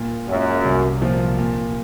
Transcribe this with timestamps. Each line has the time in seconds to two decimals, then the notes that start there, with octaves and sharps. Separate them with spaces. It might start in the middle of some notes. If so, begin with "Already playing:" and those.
Already playing: A#2
0.28 F#2 G#3 C#4 F4
0.65 C2
1.01 A#2 F3 C4
1.39 A#2